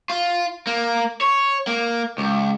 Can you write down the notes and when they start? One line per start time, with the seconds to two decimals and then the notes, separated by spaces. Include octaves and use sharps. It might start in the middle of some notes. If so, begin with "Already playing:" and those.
0.10 F4
0.67 A#3
1.21 C#5
1.67 A#3
2.18 C#2